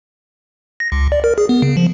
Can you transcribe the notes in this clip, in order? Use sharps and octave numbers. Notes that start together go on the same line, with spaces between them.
A#6
C#2
D5
A#4
G#4
B3
C#3
F3